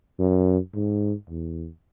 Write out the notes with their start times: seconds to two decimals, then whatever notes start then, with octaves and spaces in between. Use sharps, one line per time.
0.19 F#2
0.74 G#2
1.30 E2